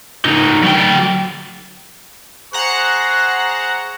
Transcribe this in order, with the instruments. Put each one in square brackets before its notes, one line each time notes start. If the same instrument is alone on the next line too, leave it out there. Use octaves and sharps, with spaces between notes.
[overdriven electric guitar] C#3 D#4
F#3 G5
[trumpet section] G#4 C5 C#6 [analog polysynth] F#5 A#5 F#6